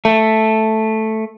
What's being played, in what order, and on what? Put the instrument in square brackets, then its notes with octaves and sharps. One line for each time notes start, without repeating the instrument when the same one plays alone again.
[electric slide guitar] A3